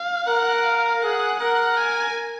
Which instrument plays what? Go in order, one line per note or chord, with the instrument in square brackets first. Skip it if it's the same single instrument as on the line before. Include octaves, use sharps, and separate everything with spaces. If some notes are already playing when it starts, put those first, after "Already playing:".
Already playing: [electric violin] F5
[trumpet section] A#4 [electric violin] F#5
[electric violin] F5
[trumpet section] G#4 [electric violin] F#5
[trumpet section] A#4 [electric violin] F#5
[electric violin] G#5